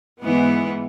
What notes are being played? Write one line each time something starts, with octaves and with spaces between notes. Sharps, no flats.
G#2 E3 B3